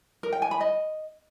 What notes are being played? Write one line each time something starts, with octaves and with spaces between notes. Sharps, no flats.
A#4
G5
G#5
B5
D#5